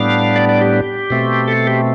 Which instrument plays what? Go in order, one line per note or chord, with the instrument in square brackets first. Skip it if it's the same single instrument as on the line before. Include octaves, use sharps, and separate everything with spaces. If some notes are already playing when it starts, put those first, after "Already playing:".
Already playing: [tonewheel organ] A2 G3 B3 D4 F5
D5
D5
G4
B2 A3 C4
A4
G4